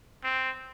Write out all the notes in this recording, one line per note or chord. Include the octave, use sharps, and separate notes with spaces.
C4